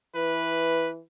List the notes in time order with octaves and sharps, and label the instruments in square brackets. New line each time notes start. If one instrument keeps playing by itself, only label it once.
[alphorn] E3 [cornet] B4